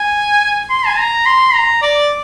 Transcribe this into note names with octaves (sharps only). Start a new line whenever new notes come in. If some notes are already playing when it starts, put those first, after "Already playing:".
Already playing: G#5
C6
G#5
A#5
C6
A#5
D5